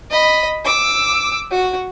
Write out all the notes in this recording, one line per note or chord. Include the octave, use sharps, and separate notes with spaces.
D#5 B5
D6 E6
F#4